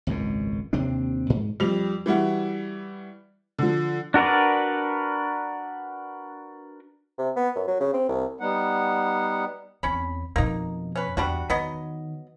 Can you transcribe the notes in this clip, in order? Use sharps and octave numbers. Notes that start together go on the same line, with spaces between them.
G#1 C#2 F#2 B2
D#2 C3 C4 D4
G#2
F2 G3 F7
E3 G3 E4 F#4
D3 F3
D4 F#4 A#4 B4 D5
C3
B3
F#2
F#3
C#3
C4
C2
G3 B3 D#4 F#5
E2 C4 C#4 B5
F2 B2 A#3 D#4
C#4 B4
E2 G3 D4 F#4
D#3 F#3 B3 D#5